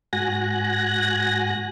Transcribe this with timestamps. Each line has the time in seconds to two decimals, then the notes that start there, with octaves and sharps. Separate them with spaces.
0.13 G#2 F#4 G#5 F#6 A#6